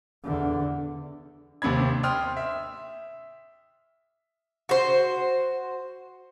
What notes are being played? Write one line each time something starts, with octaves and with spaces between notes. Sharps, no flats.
E2 D3
D#2 C3 D4 B5 G#6
G5 C6 D#6 F6
E5
F#4 C5